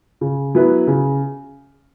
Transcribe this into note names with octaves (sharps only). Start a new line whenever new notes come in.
C#3
F#3 B3 E4 B4
C#3